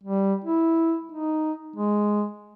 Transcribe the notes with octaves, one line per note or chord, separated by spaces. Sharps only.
G3
E4
D#4
G#3